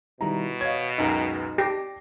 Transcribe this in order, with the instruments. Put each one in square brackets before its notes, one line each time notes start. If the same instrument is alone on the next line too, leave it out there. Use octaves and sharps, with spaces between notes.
[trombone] B2 [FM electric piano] D#3 G3 E4 [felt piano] A#5
[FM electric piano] C#5 F5 [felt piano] D#5 G#6
[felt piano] C#2 F#2 [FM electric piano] D#4
[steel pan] G4 [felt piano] A5 A#6 C7